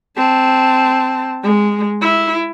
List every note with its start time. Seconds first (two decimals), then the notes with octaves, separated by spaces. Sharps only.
0.17 C4 A5
1.43 G#3
2.01 E4